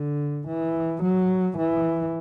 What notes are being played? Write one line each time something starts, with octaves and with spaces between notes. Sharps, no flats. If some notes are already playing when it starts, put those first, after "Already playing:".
Already playing: D3
E3
F#3
E3